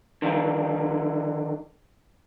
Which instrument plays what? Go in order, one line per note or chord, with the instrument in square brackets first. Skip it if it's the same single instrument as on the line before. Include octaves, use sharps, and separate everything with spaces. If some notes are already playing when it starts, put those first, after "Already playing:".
[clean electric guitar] D3 D#3 F3